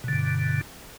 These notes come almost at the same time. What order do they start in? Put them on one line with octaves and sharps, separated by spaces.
B2 D3 G2